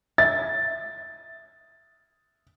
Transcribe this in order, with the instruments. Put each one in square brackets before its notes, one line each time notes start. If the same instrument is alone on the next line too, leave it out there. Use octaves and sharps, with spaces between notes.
[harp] E5 [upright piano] A6